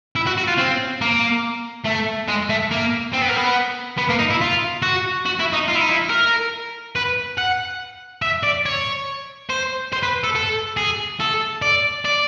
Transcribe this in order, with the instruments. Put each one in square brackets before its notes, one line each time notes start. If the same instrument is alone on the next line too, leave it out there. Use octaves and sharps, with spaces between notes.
[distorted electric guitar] E4
F#4
F#4
F4
C4
A#3
A3
G#3
A3
A#3
C4
B3
A#3
B3
B3
A#3
D#4
E4
F4
F#4
F#4
E4
D#4
F4
E4
D#4
E4
A#4
B4
F#5
E5
D5
C#5
C5
C5
B4
A4
A4
G#4
A4
D5
D5